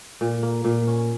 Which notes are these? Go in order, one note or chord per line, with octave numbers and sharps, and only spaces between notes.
A#2
A#3
A#2
C#4